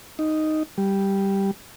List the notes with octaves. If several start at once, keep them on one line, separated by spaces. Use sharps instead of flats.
D#4
G3